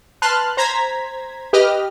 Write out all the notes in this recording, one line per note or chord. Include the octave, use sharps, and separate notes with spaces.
B4 A5 C6 F6 F#6
C5 A#5 G#6 B6
G4 B4 D#5 F6